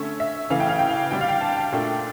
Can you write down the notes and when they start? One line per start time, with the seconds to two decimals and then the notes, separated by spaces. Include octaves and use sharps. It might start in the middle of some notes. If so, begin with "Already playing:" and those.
Already playing: D3 A3 C#4 E5
0.20 E5
0.50 C#3 E3 A3 F5
0.60 G5
0.69 F5
0.79 G5
0.89 F5
1.11 D3 G3 D4 G5
1.21 F5
1.29 G5
1.41 A5
1.57 G5
1.72 A#2 A3 D4 G5